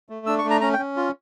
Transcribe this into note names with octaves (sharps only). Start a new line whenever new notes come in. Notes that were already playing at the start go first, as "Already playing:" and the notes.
A3
D4 E6
C#6
A3
A#5
C#4 A#5
G5
C#4
F4